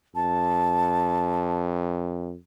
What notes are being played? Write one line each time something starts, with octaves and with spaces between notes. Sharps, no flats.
F2 A5